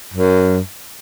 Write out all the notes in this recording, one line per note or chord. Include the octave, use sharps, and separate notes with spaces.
F#2